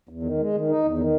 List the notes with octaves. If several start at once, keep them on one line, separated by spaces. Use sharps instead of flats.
E2
D#3
G#3
D#3
D#4
E2
D#3